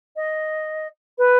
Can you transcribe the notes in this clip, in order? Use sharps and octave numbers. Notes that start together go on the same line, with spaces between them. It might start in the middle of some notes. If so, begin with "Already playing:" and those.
D#5
B4